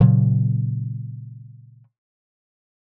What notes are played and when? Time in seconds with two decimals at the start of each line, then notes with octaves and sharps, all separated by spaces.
0.01 A#2 C#3 F#3